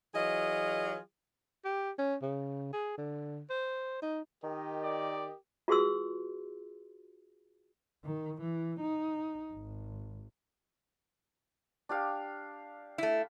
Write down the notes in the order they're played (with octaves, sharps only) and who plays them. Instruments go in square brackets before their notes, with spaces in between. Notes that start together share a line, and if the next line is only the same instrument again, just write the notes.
[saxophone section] E3 F#3 F4 G#4 D#5
[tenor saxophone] G4
C#4
C#3
G#4
D3
C5
D#4
[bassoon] D#3 [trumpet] G4 [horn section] A#4 D#5
[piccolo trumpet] D5
[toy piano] F4 F#4 G#4 B4 C6 E6
[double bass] D#3
E3
D#4
G#1
[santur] D4 G4 F5
[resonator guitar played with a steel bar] A3 E4